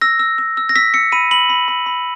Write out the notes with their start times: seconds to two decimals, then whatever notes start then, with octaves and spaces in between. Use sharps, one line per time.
0.01 E6 A#6
0.19 E6
0.38 E6
0.57 E6
0.69 A#6
0.76 E6 B6
0.94 E6 C#7
1.12 B5 D#7
1.31 B5 F#7
1.50 B5
1.68 B5
1.86 B5